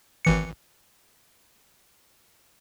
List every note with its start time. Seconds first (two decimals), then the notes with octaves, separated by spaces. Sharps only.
0.25 G#1 E3 C#7